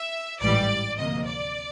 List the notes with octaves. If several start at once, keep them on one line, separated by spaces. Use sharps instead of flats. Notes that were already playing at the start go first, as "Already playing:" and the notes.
Already playing: E5
A1 G#2 E3 G3 D5
D2 C3 F3 A#3 D#5
D5